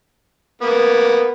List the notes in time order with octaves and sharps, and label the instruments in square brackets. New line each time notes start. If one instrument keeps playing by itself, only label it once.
[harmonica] A#3 B3